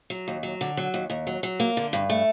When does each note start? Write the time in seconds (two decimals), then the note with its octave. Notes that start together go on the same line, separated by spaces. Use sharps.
0.10 F#3
0.28 D#2
0.43 F#3
0.61 D3
0.77 F#3
0.94 D#2
1.10 D#2
1.27 F#3
1.43 F#3
1.60 A#3
1.77 D3
1.93 G2
2.10 A3